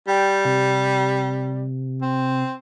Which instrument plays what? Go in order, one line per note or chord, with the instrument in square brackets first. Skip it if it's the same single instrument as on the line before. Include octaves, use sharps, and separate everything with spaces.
[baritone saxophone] G3 [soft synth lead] G5
[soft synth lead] C3
[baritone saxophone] C4